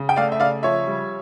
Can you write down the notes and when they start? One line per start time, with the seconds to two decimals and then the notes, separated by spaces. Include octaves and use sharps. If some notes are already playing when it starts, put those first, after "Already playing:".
Already playing: C#3
0.09 G5
0.16 A3 D5 F5
0.32 E5
0.40 C#3 D5 F5
0.63 F3 C#5 E5
0.87 G3